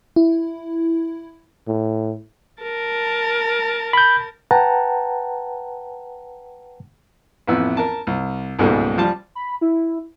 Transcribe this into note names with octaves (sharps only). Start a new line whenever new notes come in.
E4
A2
A#4 A5
B5 G6
B4 F#5 G5 A5 A#5
A1 F2 B3 E4 E6
A#4 A5
C2
C#2 G#2 B2 G3 A3 A#3
F3 G3 A5
B5
E4